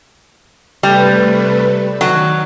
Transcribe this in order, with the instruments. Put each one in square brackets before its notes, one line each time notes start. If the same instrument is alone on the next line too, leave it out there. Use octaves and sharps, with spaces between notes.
[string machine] C3 A3 B4 [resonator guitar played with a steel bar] G3
[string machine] D#3 [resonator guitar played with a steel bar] F#3